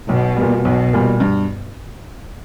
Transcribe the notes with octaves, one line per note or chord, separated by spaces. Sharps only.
B1 B2
A#2 G3
B1 B2
A#2 G3
G2